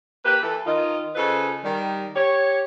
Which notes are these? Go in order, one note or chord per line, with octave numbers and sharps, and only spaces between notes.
A#3 G4 B4
E3 A4
D#3 F4 D#5
C#3 F4 A4 B4 C5 D#5
D#3 G3
G4 C#5